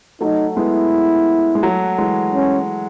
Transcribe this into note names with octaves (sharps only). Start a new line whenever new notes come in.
F#3 A3 D#4
G#3 B3 E4
G#3
F#3 A3
E3 G#3
C#4